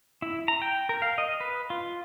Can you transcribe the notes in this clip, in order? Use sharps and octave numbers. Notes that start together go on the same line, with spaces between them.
E4
A#5
G5
A#4
F5
D#5
B4
F4